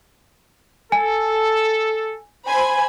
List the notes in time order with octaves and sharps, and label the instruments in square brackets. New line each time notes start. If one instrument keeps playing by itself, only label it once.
[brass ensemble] A4 [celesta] G#5
[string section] C5 G#5 B5